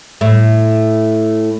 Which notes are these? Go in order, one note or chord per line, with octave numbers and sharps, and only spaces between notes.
A2